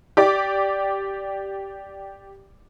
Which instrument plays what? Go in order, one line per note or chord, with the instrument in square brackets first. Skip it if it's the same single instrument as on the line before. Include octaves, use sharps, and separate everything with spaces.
[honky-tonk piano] G4 D5 D6